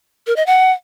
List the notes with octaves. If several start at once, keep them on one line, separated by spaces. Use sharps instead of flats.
A#4
D#5
F#5